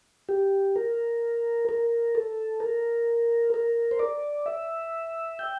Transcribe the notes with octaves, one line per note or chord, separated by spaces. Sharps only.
G4
A#4
A#4
A4
A#4
A#4
C5
D5
E5
G5